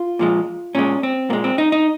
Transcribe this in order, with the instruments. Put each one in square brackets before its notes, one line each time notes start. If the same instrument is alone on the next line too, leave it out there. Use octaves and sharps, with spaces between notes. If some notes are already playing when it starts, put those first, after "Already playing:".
Already playing: [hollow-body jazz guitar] F4
A#2 F3 G#3
A#2 G#3 C#4
C4
A#2 A#3
G#3
C4
D#4
D#4